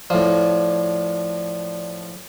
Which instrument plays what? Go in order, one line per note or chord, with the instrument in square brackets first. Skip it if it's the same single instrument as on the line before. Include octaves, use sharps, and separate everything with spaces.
[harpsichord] A2 F3 [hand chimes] D5